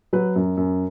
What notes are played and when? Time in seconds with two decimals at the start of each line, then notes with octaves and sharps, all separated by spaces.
0.13 F#3 B4
0.36 F#2
0.57 F#2